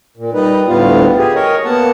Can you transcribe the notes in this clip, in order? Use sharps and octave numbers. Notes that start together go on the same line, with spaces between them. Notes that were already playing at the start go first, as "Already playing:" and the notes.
A#2
G3 D#4 B4
D2 A2 G3 B3 F4
G4 G#4
A#4 C#5 D#5
A#3 B3 F#5 A5